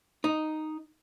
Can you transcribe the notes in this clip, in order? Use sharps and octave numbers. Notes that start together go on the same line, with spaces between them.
D#4